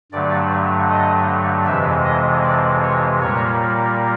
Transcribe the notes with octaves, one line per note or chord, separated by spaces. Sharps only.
G2 D3 F#3 A3 D5
D#5
F2 C3 E3 G#3 E5
D#5
D5
C#5
A#2 G3 A#3 C#5